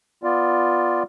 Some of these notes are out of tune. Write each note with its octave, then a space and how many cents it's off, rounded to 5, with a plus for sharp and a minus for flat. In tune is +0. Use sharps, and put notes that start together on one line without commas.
B3 +0 F4 +0 D5 +0